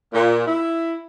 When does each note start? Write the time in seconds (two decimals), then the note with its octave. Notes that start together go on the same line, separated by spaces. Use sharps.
0.13 A#2
0.46 E4